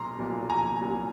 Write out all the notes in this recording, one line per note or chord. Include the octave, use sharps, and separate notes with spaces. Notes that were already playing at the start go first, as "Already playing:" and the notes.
Already playing: B1 A#2 F#3 A#5 C6
B1 A#2 F#3
G#5 A#5
C2 A#2 F#3